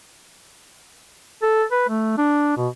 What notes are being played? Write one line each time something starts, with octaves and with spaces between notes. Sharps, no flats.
A4
B4
A3
D4
B2